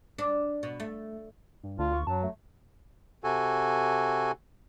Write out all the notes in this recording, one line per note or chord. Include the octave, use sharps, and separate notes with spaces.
D4
B2
A3
G2
D2 D4 F4
C#6
F#2 F#3 A5
A3
C3 F#4 A4 G#5